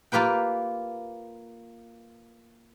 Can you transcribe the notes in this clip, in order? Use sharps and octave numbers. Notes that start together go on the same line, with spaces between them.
A#3 F4 G4 B4 G5